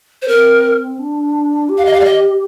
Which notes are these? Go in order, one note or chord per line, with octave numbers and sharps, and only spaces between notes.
C5
C4 A#4
D4
G4
F5
D#5
F5
D5
D#5